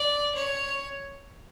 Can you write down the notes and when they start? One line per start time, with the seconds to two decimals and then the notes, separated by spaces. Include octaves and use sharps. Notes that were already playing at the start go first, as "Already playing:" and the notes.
Already playing: D5
0.35 C#5